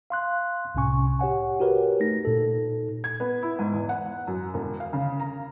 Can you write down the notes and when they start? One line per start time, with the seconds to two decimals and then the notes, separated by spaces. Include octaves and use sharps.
0.10 F5 C6 F#6
0.75 C2 A2 C3 C#4 G#5 C#6
1.19 G4 C#5 F#5 G#5
1.60 F#4 G4 A#4 B4 C#5
2.00 A3 D#4 A#6
2.25 A#2 D#4 A4
3.04 G#6
3.20 B3
3.43 E4
3.59 G#2
3.73 E2
3.89 F#5
4.27 F#2
4.54 E1
4.80 F5
4.93 C#3
5.20 A#5